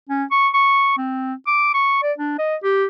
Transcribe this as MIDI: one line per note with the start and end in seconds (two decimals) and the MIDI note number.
0.09 0.24 61
0.31 0.49 85
0.54 0.94 85
0.98 1.34 60
1.47 1.72 86
1.74 2.02 85
2.03 2.13 74
2.18 2.35 62
2.39 2.56 75
2.63 2.86 67